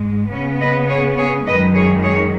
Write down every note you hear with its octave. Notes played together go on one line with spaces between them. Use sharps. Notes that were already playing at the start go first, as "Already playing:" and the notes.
Already playing: G#2 G#3
C#3 B3 C#4
B4 D#5
G#4 C#5
G#4 C#5
F#2 D#3 G#3 B4 D#5
G#4 C#5
G#4 C#5